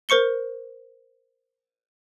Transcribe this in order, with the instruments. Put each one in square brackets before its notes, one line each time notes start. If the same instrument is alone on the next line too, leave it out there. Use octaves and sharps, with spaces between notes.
[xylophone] A#4 C5 C#6 C#7 G7